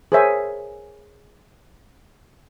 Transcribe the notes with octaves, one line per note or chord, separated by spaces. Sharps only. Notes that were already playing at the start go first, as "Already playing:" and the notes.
G#4 A#4 C5 C#5 E5 G#5